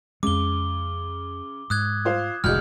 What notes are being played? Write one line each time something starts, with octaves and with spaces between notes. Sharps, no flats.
F2 C#3 G#3 D6 G7
G#2 D#6 F#6 G#6
F4 C5 F5
F1 D2 C3 G#3 F6 G6